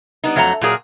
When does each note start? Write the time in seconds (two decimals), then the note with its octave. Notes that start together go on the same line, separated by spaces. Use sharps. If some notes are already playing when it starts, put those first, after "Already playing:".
0.24 G3 B3 D#4
0.36 F2 F#3 A3 F#5 A#5
0.61 A#2 F#3 G#4 A#4